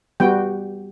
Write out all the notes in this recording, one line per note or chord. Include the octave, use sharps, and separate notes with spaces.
G3 B3 F#4 G5